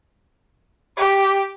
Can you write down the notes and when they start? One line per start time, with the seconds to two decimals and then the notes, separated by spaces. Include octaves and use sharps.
0.97 G4